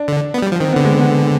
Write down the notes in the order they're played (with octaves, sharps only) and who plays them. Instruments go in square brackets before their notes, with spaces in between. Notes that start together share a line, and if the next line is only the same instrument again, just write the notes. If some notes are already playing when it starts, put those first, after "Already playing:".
Already playing: [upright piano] D4
[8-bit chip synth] D3
B3
G3
F3
[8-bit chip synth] D#3 [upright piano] C4
[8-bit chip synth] D3 [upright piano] B3
[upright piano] G#3
B3